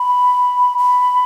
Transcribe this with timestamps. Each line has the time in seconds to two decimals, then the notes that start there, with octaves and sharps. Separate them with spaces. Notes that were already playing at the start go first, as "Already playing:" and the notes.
Already playing: B5
0.78 B5